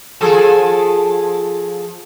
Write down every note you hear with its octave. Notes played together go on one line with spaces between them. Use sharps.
F3 G#4 A4